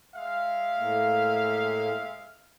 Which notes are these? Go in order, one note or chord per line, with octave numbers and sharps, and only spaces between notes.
G#3 E5 F5
A2 A#3